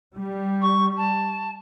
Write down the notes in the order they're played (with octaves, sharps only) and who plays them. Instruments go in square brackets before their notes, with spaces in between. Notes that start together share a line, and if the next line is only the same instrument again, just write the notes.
[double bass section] G3
[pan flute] C#6
A5